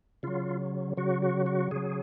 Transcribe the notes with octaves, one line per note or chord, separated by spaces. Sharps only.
C#3 F#3 F4
C#3 F#3 F#4
F#4
F#4
C#3 F#3 G#4